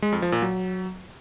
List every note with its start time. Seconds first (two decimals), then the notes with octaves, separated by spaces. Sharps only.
0.02 G#3
0.12 F2
0.22 F3
0.32 A#2
0.42 F#3